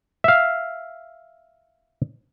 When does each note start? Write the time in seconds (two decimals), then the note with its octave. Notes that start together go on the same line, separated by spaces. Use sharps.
0.24 E5 F5